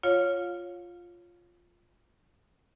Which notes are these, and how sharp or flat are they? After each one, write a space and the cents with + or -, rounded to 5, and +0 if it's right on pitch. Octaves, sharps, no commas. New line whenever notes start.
F4 +0 C#5 +0 F5 +30